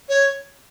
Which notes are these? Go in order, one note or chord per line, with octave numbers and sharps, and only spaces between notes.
C#5